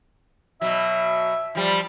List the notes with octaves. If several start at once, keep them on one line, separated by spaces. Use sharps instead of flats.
B2 F#3 E5
F3 G3